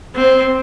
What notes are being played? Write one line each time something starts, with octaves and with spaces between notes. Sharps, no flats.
C4